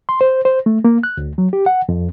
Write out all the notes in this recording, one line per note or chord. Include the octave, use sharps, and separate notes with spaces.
C6
C5
C5
A3
A#3
F#6
D2
F#3
G4
F#5
F2